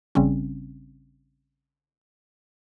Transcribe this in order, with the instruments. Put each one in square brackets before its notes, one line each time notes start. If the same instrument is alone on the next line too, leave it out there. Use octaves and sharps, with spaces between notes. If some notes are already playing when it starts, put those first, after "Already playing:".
[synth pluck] A1 C#3 G3 C4 C#4